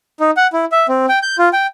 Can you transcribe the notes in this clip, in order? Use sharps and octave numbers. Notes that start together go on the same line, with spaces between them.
D#4
F#5
E4
E5
C4
G5
G6
F4
G5